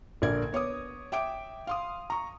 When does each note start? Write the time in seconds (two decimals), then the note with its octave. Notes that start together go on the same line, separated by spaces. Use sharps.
0.22 A#1 D3 A#4 D5 G#6
0.52 B3 C#5 D6 D#6
1.12 E5 G5 D6 D7
1.67 F5 C6 D#6
2.10 A#5 C#6